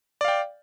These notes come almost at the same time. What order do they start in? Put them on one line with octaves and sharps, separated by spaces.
D5 F5 G5